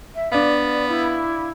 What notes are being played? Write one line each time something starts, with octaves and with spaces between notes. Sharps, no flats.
E5
B3 D4 D5 F5
E4